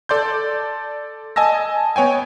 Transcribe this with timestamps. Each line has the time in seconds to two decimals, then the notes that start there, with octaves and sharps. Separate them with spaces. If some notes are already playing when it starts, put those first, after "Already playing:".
0.09 A4 D5 C6 G6
1.36 D#5 G#5 A5 E6 A#6
1.96 B3 C#5 G5 G#5